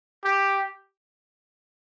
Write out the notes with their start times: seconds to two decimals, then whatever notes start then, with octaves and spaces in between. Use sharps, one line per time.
0.25 G4